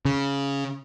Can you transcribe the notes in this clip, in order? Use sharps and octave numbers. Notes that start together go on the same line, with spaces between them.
C#3